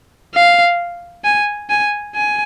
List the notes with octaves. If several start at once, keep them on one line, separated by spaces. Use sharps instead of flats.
F5
G#5
G#5
G#5